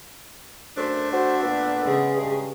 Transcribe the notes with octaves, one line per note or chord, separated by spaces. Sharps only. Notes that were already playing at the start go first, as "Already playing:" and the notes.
F#2 A3 D4 C5
F#4 C5
A#2 B3
C#3 G#3 G#4
G2